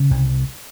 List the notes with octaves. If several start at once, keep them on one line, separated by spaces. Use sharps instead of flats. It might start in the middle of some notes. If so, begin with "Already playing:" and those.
Already playing: C#3
C2